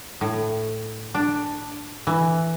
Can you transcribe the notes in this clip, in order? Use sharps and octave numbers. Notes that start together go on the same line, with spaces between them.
A2
D4
E3